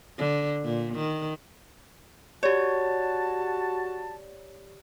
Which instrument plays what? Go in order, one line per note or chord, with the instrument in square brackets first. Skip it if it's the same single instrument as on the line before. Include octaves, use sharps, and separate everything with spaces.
[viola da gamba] D3
A#2
D#3
[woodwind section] F#4 A5 [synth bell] G4 D5 [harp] C#5